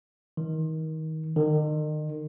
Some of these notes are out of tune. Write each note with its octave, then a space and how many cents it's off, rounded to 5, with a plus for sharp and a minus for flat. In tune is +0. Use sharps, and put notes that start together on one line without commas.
D#3 +25
D#3 -35